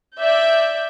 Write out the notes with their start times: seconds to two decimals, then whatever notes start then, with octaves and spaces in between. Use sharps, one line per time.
0.19 D5 E5 G6